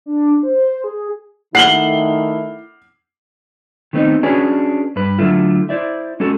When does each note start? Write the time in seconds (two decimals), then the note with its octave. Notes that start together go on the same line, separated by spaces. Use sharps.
0.06 D4
0.43 C5
0.84 G#4
1.55 D#3 A3 E4 F#5 C7 F#7 G7
3.93 D#3 A3 B3 C4 D#4
4.23 C#4 D4 F#4 G#4 B4 C#5
4.96 G2 B4
5.18 D3 F#3 A3 E4 F4
5.69 E4 C5 D5 E5
6.20 G#3 C#4 F#4 A4